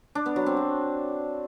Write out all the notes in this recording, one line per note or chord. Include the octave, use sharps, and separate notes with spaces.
D4
B3
F#3
C4
F#4